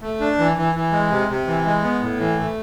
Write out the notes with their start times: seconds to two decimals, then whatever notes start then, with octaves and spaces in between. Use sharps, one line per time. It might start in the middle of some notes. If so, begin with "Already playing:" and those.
0.02 A3
0.20 D4
0.38 E3
0.57 E3
0.75 E3
0.92 G#3
1.11 C3
1.29 C3
1.47 E3
1.65 G#3
1.83 B3
2.02 A2
2.20 E3
2.37 A3